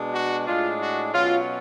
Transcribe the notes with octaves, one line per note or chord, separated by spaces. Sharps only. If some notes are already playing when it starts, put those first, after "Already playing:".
Already playing: B2 G#3 D4
F#4
A2 G#3 D4 F4
F#4
B2 F#3 C#4 F4